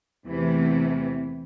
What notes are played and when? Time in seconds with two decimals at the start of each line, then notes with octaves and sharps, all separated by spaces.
0.25 E2 C3 E3 A3